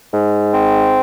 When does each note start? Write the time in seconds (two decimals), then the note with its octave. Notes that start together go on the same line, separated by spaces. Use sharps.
0.12 G#2
0.53 C4